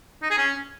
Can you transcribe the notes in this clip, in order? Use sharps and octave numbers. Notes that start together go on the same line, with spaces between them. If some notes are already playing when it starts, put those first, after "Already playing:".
D#4
G#4
C#4